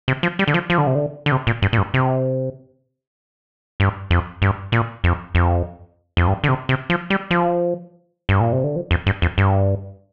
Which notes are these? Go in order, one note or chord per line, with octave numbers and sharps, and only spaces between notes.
C3
F3
G3
D3
F3
F3
D3
C3
D3
D3
C3
A#2
G2
A#2
G2
C3
G2
F2
G2
A#2
F2
F2
F2
G2
D3
C3
C3
F3
G3
F3
G2
A#2
C3
D3
F3
F2
G2
F2
G2